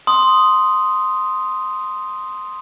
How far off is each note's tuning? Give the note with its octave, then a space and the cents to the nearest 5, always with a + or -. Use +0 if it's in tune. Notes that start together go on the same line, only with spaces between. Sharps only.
C6 +0 D#6 +0